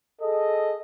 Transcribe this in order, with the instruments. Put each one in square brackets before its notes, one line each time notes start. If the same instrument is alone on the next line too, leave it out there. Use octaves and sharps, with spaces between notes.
[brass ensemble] G#4 A4 D#5